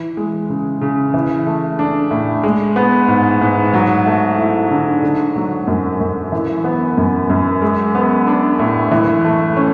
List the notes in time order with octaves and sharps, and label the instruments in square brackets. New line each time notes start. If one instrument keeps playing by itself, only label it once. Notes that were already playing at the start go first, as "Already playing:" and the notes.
Already playing: [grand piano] E3
G#3
C#3
C#3
E3
A3
D4
A2
G#3
B3
G#2
G#2
F#3
A3
E4
D3
D3
F#3
F#2
F#2
E3
B3
F#2
F#2
G#3
B3
D4
A2
E3
A3
C#4